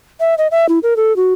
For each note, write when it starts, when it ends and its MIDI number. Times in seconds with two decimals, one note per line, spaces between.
0.20 0.35 76
0.38 0.47 75
0.51 0.68 76
0.69 0.79 64
0.83 0.96 70
0.96 1.15 69
1.16 1.34 66